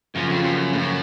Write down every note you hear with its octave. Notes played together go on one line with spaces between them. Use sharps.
F#2 C#3 F3 A#3 C#4 F4
F2
F#2
A2
F#2